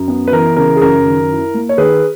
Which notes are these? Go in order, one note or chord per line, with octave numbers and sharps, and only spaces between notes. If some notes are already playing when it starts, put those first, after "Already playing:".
Already playing: F#2
B3
B4
E3 A#4
C#3 A#4
G#4
F#2 A#4
D#3
E4
A#3
C#5
D#3 G#4 B4